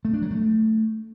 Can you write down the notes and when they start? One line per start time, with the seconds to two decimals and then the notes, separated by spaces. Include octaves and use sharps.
0.05 A3
0.13 D4
0.22 F#3
0.31 A3